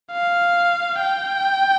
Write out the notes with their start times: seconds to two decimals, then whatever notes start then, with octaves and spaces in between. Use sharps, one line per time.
0.12 F5
1.00 G5